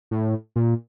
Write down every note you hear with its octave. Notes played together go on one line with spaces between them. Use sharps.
A2
A#2